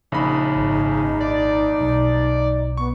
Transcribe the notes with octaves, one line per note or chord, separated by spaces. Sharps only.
A#1 C#3 D#4 B5
G#1
D5
B1
B3 C#6